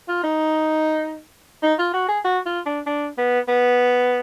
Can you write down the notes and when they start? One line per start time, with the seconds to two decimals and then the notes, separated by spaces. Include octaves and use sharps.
0.08 F4
0.24 D#4
1.63 D#4
1.79 F4
1.94 F#4
2.09 G#4
2.24 F#4
2.46 F4
2.66 D4
2.86 D4
3.18 B3
3.48 B3